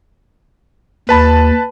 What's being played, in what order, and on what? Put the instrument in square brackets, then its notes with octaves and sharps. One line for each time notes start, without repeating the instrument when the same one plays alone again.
[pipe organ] D#2 [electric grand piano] B4 A5 B5